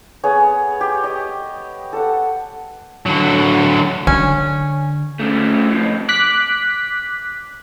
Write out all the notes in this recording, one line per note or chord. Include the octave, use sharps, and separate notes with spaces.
B3 G#4 C#5
G4
D#5
A4 F#5
D3 F#3
D3 C#4
C#3 A3
F2 A2
D6 F#6 B6